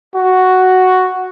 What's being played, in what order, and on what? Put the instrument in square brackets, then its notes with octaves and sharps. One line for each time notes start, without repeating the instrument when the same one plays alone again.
[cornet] F#4